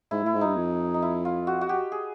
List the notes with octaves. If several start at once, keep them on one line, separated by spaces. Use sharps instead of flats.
G#2 E4
A2 E4
G#2
G2 D#4
F2
D#4
E4
F4
F#4
F#4
G4
G#4